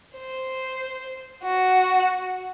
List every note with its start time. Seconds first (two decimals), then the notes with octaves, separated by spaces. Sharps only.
0.18 C5
1.43 F#4